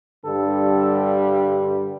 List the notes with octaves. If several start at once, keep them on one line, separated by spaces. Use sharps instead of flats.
G2 D3 G3 A4